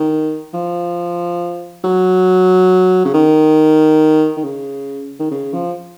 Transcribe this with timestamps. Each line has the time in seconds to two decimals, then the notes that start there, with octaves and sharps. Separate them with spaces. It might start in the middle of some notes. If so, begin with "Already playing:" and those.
Already playing: D#3
0.54 F3
1.84 F#3
3.05 C#3
3.14 D#3
4.37 D#3
4.44 C#3
5.20 D#3
5.31 C#3
5.53 F3